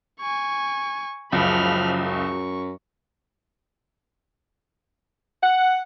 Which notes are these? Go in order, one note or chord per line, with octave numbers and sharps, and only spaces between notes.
G#5 C#6
F#1 C#2 F3 F#3 B5 F6
F#2 C#6
F#5